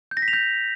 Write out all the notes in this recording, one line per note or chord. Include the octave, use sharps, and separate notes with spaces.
G6
A#6
B6
F7
G6